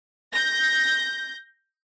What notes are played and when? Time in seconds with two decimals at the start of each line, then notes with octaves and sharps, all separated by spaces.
0.34 G6 A#6